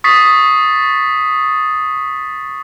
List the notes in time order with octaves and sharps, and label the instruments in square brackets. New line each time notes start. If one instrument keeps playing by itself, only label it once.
[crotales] C#6 D#6 A6 B6 C7